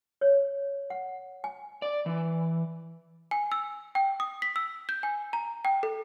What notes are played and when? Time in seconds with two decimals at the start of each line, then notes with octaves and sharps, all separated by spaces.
0.21 C#5
0.90 F#5
1.44 G#5
1.82 D5
2.06 E3
3.31 G#5
3.52 E6
3.95 G5
4.20 D#6
4.42 B6
4.56 E6
4.89 G6
5.03 G#5
5.33 A#5
5.65 G5
5.83 A4